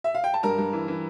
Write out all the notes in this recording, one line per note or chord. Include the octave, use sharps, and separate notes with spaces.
E5
F5
G5
A5
G2 A#4 A#5
G2
E3
E3